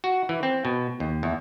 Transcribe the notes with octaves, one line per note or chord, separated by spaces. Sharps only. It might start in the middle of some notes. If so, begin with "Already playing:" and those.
F#4
E3
C4
B2
D#2
E2